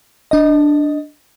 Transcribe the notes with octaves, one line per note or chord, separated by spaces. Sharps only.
D4 D#5